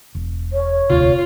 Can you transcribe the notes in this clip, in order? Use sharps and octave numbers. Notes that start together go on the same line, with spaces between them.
E1
C#5
E1 D2 C3 F4